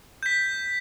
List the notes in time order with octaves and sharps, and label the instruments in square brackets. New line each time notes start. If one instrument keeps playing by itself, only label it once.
[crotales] G6 B6